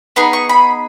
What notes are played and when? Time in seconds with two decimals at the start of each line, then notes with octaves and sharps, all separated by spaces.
0.16 B3 D#4 G#4 B5
0.33 C#6
0.49 B5